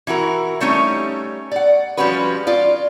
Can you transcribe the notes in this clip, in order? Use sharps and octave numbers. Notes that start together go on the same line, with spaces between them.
E3 E4 F#4 A#4
G3 A3 C#4 D#4 C#5
D5 F#5
F3 G3 G#3 C#4 F#4 B4
F4 D5